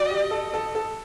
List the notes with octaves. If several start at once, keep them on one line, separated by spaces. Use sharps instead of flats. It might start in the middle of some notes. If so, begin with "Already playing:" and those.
Already playing: F#4 D#5
G4
A4
A4
A4